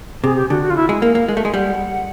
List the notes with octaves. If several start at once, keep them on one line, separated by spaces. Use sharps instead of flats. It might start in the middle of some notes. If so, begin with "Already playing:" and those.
C3 G#4
G4
D3 F#4
F#4
F4
E4
G#3
A#3 A#4
A#3
G#3
A3
G#3
G3 F#5